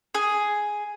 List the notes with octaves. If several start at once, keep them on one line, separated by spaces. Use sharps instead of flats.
G#4